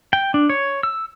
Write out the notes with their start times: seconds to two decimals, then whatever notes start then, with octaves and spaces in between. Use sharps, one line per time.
0.13 G5
0.34 D4
0.49 C#5
0.83 E6